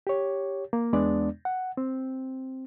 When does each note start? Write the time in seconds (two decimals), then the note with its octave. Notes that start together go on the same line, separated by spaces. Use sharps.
0.07 G4 C#5
0.73 A#3
0.93 E2 G#3 B3 D4 D5
1.45 F#5
1.77 C4